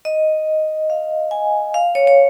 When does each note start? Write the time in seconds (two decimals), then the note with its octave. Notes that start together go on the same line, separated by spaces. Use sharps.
0.05 D#5
0.90 F5
1.31 G#5
1.74 F5
1.95 C#5
2.07 C#5